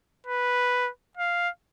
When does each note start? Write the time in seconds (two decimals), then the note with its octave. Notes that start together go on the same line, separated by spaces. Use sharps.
0.26 B4
1.17 F5